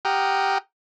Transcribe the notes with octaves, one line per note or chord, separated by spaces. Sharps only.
G4 F#5 G5 A#5 D#6 F6